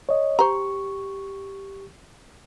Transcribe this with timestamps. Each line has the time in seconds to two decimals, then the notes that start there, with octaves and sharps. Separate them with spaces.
0.09 C#5 D#5
0.39 G4 C5 A#5 C#6